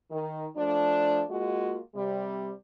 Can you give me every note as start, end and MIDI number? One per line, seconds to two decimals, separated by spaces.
0.11 0.47 51
0.57 1.23 53
0.57 1.23 57
0.57 1.23 62
1.29 1.79 56
1.29 1.79 58
1.29 1.79 65
1.29 1.79 66
1.95 2.53 48
1.95 2.53 55